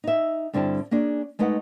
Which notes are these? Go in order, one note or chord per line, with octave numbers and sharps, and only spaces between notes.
D#4 E5
G2 D3 G3 C4 E4 A5
A#3 C#4 D4 G#4
G#3 A3 D#4 B4 D#5 F#5